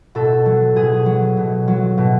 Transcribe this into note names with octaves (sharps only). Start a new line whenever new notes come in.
B2 A4
F#3
B2 G#4
F#3
B2
F#3
B2